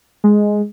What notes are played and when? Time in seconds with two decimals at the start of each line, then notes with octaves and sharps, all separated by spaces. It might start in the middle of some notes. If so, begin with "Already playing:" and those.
0.24 G#3